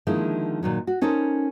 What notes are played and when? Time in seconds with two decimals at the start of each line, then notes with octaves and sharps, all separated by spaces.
0.07 D3 D#3 F3 G#3 A#3 E4
0.63 A#2 D#3 F#3
0.87 F#4
1.01 C#4 D#4 A4 A#4 C5